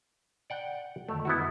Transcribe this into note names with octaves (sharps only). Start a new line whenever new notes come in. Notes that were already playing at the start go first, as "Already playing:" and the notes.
D5 F#5 G5
F2 D3 D#3 A3
B3 E4 F#4